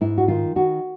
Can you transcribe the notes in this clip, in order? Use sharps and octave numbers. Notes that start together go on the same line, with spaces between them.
G#2 E4
F#4
D#3 F4
D#3 F#4